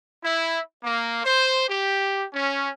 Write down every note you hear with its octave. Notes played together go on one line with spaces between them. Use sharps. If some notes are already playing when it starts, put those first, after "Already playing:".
E4
A#3
C5
G4
C#4